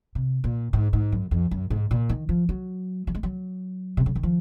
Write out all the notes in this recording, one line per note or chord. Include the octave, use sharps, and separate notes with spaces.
C3
A#2
G#2
G#2
F#2
F2
F#2
G#2
A#2
D#3
F3
F#3
F#3
G#3
F#3
C3
C#3
D#3
F3